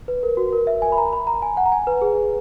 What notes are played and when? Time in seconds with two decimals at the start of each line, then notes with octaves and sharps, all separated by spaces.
0.08 B4
0.23 A#4
0.37 F#4
0.53 A#4
0.67 E5
0.82 G#5
0.92 B5
0.98 A#5
1.13 B5
1.27 A#5
1.42 G#5
1.57 F#5
1.66 A#5
1.72 G#5
1.87 B4
2.02 G#4